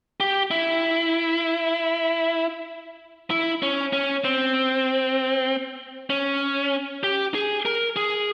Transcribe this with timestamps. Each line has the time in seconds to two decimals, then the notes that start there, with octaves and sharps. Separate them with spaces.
0.20 G4
0.51 E4
3.30 E4
3.62 C#4
3.93 C#4
4.24 C4
6.10 C#4
7.04 G4
7.35 G#4
7.65 A#4
7.96 G#4